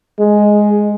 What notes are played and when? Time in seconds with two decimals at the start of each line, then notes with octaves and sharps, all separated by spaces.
0.19 G#3